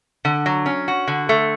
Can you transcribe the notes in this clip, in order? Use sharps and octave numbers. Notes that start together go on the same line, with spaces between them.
D3
F#3
C#4
F#4
D3
A3